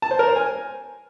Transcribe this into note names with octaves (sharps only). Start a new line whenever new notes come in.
A5
C5
A#4
C5
G#5